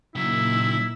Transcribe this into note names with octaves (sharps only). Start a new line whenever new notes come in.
A#2 C#3 F#3 D#4 E4 E6